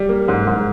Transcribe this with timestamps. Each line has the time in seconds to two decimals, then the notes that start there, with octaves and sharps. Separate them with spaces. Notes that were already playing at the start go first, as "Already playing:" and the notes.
Already playing: G3
0.09 A#3
0.28 G#2
0.47 G#2